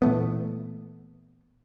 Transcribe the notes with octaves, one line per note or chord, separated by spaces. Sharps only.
A#2 E3 A3 B3